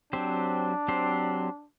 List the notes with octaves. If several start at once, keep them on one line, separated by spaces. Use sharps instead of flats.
F#3 C4 D4 G4 C5
F#3 C4 G4 C5